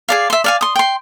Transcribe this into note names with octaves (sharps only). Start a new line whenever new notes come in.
G#4 D5 F5
E5 C6
D5 F5 G#5
C6 D#6
G5 C6